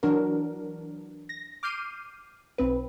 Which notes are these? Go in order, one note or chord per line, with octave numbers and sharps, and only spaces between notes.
E3 F#3 D4 F#4 A#4
A#6
D6 F6 G6 C7 D#7
B1 C4 B4